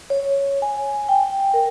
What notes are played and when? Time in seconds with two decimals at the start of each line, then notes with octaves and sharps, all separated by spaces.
0.10 C#5
0.62 G#5
1.09 G5
1.54 A#4